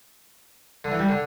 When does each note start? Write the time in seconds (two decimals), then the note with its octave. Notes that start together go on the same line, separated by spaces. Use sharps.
0.84 D3
0.92 E3
0.99 G3
1.09 D3